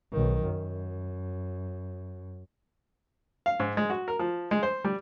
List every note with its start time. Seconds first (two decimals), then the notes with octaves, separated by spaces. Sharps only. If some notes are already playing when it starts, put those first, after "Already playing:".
0.12 B1 D#3
0.44 F#2
3.46 F5
3.60 G#2
3.77 G#3
3.90 F#4
4.08 A#4
4.19 F3
4.51 G#3
4.63 C5
4.84 G3